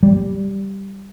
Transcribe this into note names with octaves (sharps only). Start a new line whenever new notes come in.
G3